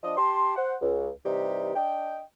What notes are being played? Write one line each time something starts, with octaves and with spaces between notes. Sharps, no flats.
F3 D4 D#5
G4 A5 C6
C5 F#5
C#2
C3 E3 G3 D#4 G4
D4 D#5 G5